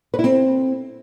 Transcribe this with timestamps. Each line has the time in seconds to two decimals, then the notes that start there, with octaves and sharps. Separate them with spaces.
0.14 B4
0.19 E4
0.24 C4